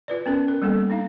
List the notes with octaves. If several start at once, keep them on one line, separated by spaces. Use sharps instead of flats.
F4 B4 D5
B3 C#4 A#4
A#4
G3 A#3 B3 A4
D4 D#4 F5